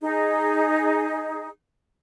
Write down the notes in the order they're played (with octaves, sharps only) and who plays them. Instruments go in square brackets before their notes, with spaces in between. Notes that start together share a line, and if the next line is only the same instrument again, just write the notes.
[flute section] D#4 G#4